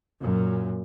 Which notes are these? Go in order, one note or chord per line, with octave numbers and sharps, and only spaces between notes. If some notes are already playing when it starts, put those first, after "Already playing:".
F#2 A#2